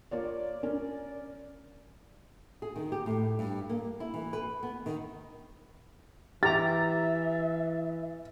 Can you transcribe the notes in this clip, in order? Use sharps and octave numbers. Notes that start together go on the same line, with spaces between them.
A#3 F4 C#5 D5
C#4 A#4
G#4
D#3
G4
A2
G2
A#3
E4
E3
B4
B3
D#3
E3 G4 E5 A#5 A6